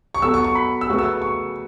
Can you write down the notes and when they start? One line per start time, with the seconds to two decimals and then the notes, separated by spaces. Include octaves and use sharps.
0.15 C#6
0.22 F#3 B3 F#4 A4 E6
0.34 C#6
0.44 C#6
0.55 B5
0.81 E6
0.89 C#3 A3 F#4 B4 C#6
0.99 E6
1.22 C#6